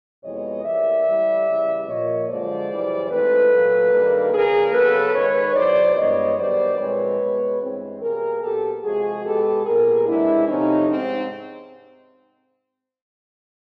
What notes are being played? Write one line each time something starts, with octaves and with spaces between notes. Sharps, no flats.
F2 C3 E3 G#3 B3 C#5 D#5
A2 E3 G3 A#3 D5 E5
A2 E3 G3
C#3 E3 G3
A#2 F3 A#3 C#5 D#5
F#2 D3 F3 G#3 C5 D5
F#2 C#3 E3 G3
G#2 E3 A3 C4 A4 B4
A#2 F#3 A#3
G2 D#3 G3 A#3
C#3 F3 A#3 G#4 A#4
C#3 F#3 B3 A4 B4
G#2 D#3 G#3 B4 C#5
E2 B2 F#3 C5 D5
G2 E3 G#3 B3 C#5 D#5
F#2 D#3 G3 B3 C5 D5
A#2 F3 G#3 C4 B4 C#5
B2 G#3 B3
G2 E3 G#3 C4
B2 G3 A#3 G#4 A#4
A#2 F#3 B3 G4 A4
C3 F3 G#3 F#4 G#4
B2 G#3 B3 G4 A4
A#2 G3 B3 G#4 A#4
C3 E3 G#3 D4 E4
C3 F3 A3 C4 C#4 D#4
G#2 C4